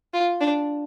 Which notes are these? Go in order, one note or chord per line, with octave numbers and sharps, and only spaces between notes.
F4
D4